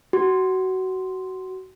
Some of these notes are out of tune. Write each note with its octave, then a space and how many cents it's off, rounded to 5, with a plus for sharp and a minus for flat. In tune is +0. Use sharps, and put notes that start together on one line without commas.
F#4 +20